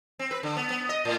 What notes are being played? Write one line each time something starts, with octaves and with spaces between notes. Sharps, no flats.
C4
B4
D3
B3
B3
D#5
A2